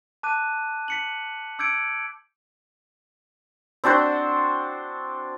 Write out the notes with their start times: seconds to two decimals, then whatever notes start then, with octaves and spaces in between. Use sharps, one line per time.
0.23 A5 D6 F#6 D#7
0.88 B6 C#7 F#7
1.59 D6 E6 G6 G#6 C#7 D7
3.84 C4 D4 F#4 C5